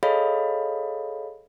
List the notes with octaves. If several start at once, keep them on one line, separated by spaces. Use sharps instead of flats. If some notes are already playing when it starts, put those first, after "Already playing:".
G#4 A4 C#5 D#5 F5 B5